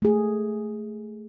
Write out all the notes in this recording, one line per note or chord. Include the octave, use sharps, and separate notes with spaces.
A3 G#4